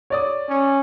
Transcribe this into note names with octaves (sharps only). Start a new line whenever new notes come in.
C#5 D5 D#6
C#4